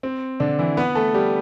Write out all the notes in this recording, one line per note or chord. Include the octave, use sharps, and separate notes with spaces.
C4
D3 D4
E3 E4
B3 B4
A3 A4
G3 G4